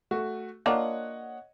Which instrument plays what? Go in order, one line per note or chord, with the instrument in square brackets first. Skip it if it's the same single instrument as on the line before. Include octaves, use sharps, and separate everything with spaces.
[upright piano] A3 F#4
[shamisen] A#3 D4 F4 [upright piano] C#5 D#5 F#5